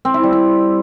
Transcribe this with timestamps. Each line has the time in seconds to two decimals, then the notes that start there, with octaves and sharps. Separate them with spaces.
0.05 C4
0.14 E4
0.23 G3
0.33 C4